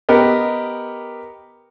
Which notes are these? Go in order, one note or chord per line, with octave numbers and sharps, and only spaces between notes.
B3 G4 A#4 D#5